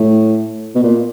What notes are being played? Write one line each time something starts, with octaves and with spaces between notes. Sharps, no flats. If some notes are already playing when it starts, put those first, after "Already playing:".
Already playing: A2
B2
A#2